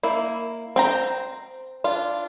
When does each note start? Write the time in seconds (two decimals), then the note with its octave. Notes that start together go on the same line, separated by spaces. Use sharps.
0.03 A#3 E4
0.76 C4 G5 A#5
1.84 D4 F4